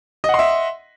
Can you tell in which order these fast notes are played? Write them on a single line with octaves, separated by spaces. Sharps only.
D#5 F#5 C6 E5